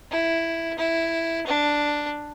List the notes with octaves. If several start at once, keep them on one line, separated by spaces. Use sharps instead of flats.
E4
E4
D4